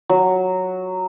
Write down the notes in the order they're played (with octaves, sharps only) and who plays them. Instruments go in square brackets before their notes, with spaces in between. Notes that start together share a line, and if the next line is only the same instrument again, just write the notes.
[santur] F#3